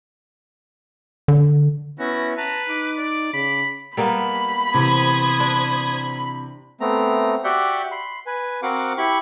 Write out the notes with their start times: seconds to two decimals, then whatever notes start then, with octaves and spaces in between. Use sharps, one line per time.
1.28 D3
1.99 B3 C#4 E4 F#4
2.37 B4 A5 A#5
2.69 D#4 D6
2.98 D5
3.33 C#3 B5
3.97 G3 A#3 B3 B5
4.74 C3 E3 C5 D#6 G#6
5.40 D4
6.81 A3 B3 C4 A#5
7.44 F#4 G4 D5 E5 F#5 G6
7.92 B5 C6
8.27 B4 G#5
8.63 C4 F#4 A#4 F5 F#5 D6
8.98 E4 G4 B5 C#6